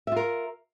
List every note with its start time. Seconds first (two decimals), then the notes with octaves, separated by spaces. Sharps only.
0.07 E5
0.12 F4
0.16 A#4